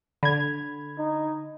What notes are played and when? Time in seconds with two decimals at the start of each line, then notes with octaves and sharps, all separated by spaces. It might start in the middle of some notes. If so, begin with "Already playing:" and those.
0.23 D3 B5 G#6
0.98 D#4